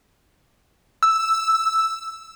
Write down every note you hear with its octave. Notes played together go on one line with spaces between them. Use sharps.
E6